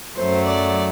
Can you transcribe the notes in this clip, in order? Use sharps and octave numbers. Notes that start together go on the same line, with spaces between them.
F#2 F#3 A3 C5
D5